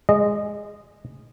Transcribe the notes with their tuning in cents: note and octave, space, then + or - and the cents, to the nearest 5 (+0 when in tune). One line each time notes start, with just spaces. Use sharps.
G#3 -5 D#5 -15